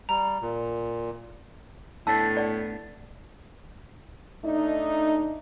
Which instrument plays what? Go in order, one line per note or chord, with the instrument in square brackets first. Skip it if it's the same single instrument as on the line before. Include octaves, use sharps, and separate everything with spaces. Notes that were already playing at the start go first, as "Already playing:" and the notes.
[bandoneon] G3 [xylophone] A#5
[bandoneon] A#2
[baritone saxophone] A2 [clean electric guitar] A3 B3 D4 [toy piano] A5 E6
[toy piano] D5 F#5
[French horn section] A3 D4 D#4